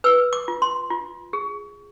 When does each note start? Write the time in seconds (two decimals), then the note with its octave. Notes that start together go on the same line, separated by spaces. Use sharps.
0.04 B4 E6
0.33 D6
0.48 F4
0.62 C6
0.90 F4
1.33 G#4